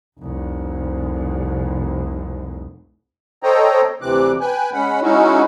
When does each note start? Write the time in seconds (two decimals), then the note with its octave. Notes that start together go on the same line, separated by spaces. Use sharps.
0.19 F1 C2
3.43 A4 C5 C#5 D#5 G5 A#5
4.02 D2 C3 E3 C4 D6 F#6
4.40 B4 G5 G#5 F#6
4.73 G#3 C#4 F#5 B5
5.02 G#3 C#4 D#4 E4 F#4